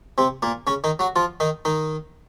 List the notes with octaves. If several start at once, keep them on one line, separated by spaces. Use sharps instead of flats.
C3 C4
A#2 A#3
C#3 C#4
D#3 D#4
F#3 F#4
F3 F4
D#3 D#4
D#3 D#4